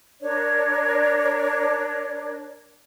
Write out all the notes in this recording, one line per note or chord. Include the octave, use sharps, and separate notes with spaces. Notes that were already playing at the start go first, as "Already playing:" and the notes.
D4 A#4 C#5 D5